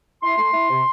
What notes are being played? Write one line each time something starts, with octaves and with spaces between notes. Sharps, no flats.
E4 C6
A3
E4
C3